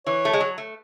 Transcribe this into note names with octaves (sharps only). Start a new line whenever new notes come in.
E3 C#5
A3
G#3
F#3
A3